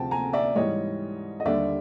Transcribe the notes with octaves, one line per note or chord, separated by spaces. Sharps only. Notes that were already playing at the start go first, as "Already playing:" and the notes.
Already playing: D2 C3 F3 G5 A5
G#5 A#5
D5 E5
G#2 E3 G3 C#5 D#5
D#5
D#2 D3 G3 D5 E5